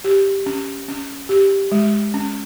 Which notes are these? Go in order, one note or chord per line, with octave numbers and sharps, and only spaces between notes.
G4
C#4
C#4
G4
G#3
C#4